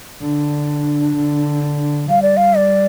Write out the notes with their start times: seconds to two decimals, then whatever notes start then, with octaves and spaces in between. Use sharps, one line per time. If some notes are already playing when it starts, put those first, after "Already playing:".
0.20 D3 D4
1.15 D3
2.09 G3 F5
2.22 D5
2.37 F5
2.57 D5